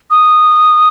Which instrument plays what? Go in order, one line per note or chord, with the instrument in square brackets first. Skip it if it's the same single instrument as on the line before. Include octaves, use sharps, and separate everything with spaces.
[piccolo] D#6